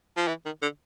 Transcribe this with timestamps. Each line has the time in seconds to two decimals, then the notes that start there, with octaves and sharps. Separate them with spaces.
0.17 F3
0.28 E3
0.46 D#3
0.62 D3